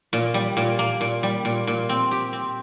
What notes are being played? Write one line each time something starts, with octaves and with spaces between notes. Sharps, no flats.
A#2
G3
A#2
A#3
A#2
G3
A#2
A#2
C4
G4
C4